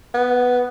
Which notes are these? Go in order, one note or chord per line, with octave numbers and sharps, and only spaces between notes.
B3